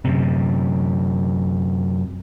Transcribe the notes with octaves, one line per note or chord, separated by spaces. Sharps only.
F#2 C3